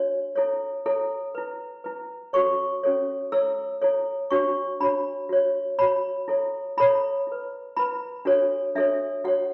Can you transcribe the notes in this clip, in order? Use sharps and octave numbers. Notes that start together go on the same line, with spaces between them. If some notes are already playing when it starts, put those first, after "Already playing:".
Already playing: D4 F#4 C#5
E4 A4 C#5
E4 A4 C#5
E4 B4
E4 B4
C#4 F#4 A4 C#5 C#6
C#4 F#4 A4 C#5
E4 A4 C#5 E6
E4 A4 C#5
D4 F#4 C#5 C#6
D4 F#4 C#5 B5
F#4 C#5
F#4 C#5 B5
E4 A4 C#5
E4 A4 C#5 B5
E4 B4
E4 B4 B5
D4 F#4 A4 C#5
D4 F#4 A4 C#5 E5
F#4 A4 C#5 F#5